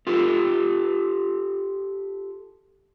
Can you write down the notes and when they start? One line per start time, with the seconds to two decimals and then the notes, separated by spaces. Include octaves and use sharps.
0.07 F4 G4 A4